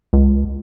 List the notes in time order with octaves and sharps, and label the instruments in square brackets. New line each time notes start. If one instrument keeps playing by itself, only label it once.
[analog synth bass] C#2